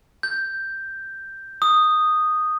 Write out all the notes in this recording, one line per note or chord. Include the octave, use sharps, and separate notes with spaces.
G6
D#6